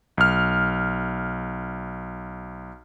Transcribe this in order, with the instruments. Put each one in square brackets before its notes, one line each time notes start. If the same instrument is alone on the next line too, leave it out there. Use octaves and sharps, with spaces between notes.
[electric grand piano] B1 F6